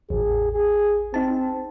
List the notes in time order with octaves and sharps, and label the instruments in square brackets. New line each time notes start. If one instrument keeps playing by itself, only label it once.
[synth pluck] A1 E2 [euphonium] G#4
[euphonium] G#4
[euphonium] C4 [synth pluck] D#4 A5